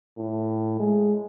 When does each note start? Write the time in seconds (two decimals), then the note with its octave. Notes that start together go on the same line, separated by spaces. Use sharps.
0.17 A2
0.80 G#3